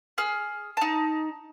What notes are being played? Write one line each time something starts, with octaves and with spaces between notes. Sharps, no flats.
G#4 F6
D#4 A5